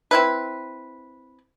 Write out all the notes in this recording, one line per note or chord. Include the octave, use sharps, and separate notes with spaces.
C4 E4 B4